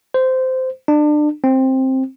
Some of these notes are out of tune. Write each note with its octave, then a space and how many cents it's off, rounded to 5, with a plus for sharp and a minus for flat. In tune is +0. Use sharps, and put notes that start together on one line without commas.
C5 -15
D4 +30
C4 +10